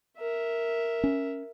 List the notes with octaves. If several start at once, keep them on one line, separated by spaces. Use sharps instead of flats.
A#4 E5
C#4